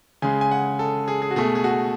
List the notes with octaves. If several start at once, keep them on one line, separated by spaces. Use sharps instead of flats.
C#3 G#3 G#5
G#5
F#5
A4
G#4
G#4
F#4
B2 A3 G#4
G#4
F#4